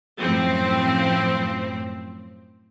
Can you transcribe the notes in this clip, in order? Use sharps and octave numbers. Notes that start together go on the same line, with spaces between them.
F#2 A2 F3 C4